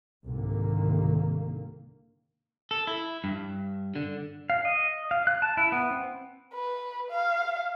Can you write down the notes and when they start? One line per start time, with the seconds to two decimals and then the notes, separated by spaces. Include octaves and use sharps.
0.25 C2 G#2 D3 D#3 A#3
2.71 A4
2.87 E4
3.24 G2
3.96 D3
4.50 F5
4.65 D#5
5.11 F5
5.27 F#6
5.42 A5
5.57 E4
5.72 B3
5.91 C4
6.54 B4
7.10 F5